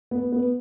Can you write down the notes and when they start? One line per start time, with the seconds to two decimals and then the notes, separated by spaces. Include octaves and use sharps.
0.11 B3
0.32 B3